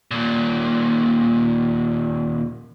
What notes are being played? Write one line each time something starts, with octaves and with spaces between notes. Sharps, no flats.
D#2 A#2